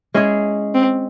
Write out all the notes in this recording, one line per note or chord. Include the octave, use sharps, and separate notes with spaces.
G#3 C#4 E4 G#4
C4